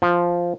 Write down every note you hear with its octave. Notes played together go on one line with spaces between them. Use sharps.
F3